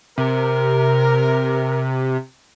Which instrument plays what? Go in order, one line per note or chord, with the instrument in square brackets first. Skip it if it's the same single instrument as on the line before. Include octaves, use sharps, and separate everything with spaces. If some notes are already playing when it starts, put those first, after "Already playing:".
[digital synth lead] C3 [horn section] A#4